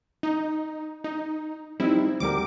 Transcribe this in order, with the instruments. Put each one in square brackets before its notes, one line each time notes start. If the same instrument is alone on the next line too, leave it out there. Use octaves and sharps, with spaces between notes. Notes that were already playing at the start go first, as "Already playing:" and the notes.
[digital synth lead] D#4
D#4
[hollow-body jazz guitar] G3 C4 D#4 [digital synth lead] E4
[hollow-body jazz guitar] D2 G3 A#4 [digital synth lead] D6